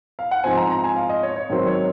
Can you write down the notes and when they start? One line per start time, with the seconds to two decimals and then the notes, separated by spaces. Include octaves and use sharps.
0.19 F5
0.31 F#5
0.44 G#2 F3 C4 G#5
0.57 A#5
0.70 A#5
0.84 G#5
0.96 F5
1.09 D#5
1.23 C#5
1.36 C#5
1.50 G#2 D#3 F#3 C4
1.67 C#5